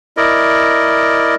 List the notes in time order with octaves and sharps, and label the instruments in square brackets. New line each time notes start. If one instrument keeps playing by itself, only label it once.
[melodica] E4 A#4 D5 D#5